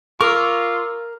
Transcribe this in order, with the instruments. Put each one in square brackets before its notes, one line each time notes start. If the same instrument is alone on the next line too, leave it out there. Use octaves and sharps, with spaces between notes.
[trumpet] F4 [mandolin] A#4 [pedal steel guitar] C#6 D6 E6